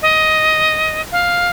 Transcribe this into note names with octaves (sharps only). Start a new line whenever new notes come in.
D#5
F5